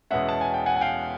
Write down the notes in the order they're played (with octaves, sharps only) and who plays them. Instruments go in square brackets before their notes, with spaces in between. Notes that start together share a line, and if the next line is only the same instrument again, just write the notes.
[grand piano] E2 B2 G#3 C#4 E5 F#5
A5
G#5
G5
F#5 G#5
G#5
F5 G5